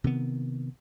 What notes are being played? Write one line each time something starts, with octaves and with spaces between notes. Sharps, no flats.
C3 D#3 B3